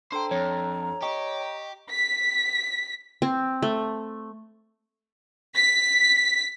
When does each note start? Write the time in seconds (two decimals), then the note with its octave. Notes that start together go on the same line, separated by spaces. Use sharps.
0.12 D4 A4 C5 G5 A#5
0.31 F2 C#5
1.02 G4 D#5 G5 C#6
1.92 B6
3.22 C4
3.62 A3
5.54 B6